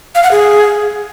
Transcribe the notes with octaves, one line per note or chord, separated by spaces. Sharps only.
F5
F#5
G#4